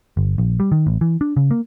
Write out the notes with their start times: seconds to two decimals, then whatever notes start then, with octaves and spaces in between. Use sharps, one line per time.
0.17 G1
0.38 A#1
0.60 G3
0.72 D#3
0.87 A1
1.01 E3
1.21 D4
1.37 C#3
1.51 A#3